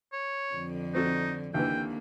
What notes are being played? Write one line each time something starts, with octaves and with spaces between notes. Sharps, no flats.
C#5
F2 D3
C4 D#4 F#4 A4
D#2 D3 E3 A#3 G5